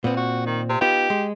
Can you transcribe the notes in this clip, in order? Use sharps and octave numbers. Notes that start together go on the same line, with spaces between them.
A#2 B3 C4
F#4
D#3
C3
B3 D#4 F4 G4
G#3